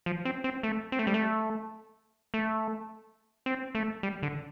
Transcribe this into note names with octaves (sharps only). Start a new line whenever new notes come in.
F3
C4
C4
A3
C4
A3
G3
A3
A3
C4
A3
G3
D3